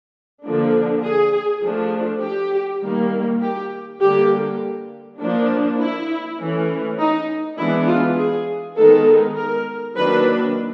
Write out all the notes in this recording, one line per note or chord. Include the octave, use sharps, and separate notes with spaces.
D3 F3 A#3 D4
G#4
F3 A3 D4
G4
D#3 G3 A#3
G4
D3 G3 A#3 G4
F3 A#3 D4
E4
E3 A3 C#4
D#4
E3 G#3 B3 D4 E4
F4
G#4
D#3 G#3 B3 D#4 A4
A#4
D#3 F#3 A#3 D4 B4